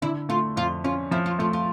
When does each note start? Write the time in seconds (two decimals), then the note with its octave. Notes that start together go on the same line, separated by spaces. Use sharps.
0.02 D3 E4
0.29 A3 F4
0.56 F2 F4
0.84 C#4 F4
1.11 F3 E4
1.26 F4
1.39 A3 F4
1.53 F4